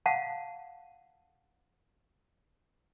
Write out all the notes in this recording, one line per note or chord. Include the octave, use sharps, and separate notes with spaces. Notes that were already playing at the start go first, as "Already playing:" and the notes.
F5 F#5 A5